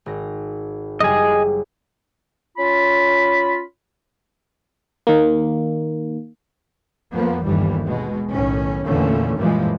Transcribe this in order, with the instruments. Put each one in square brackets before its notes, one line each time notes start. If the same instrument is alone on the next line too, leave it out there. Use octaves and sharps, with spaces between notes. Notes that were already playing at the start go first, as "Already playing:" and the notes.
[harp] G#1 A#6
[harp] F#1 G3 G#4 [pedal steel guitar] D#5 G#5
[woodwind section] C#4 F4 B5
[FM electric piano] D#3 A#3
[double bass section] F2 F3 A#3 B3
G1 D#2 E3 G3
B2 G#3
B1 A2 D#3 C#4
E2 A#2 D3 E3 A3 C#4
F#2 A#2 E3 F3 G3 G#3